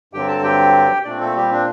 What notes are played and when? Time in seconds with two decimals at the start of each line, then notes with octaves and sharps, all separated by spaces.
0.13 G2 D3 F#3 C4 G4 G5
0.28 A4 A5
0.43 G4 G5
1.05 A#2 A3 C4 D4 D5
1.20 A3 A4
1.36 G3 G4
1.52 D4